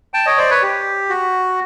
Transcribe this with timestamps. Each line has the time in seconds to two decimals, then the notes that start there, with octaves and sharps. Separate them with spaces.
0.14 G5 A5
0.26 C#5 D#5
0.38 C5 D5
0.50 B4 C#5
0.62 G4
1.09 F#4